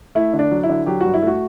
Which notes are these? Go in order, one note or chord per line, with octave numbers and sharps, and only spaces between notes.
A3 E4
D3
D4
F#3
E4
D3
F#3 G4
G2 F#4
E4
A3 F#4